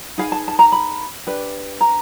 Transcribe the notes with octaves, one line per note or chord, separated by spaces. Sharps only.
D#4 G#4 B4 F5
A5
A5
A#5
B5
D4 G4 B4
A#5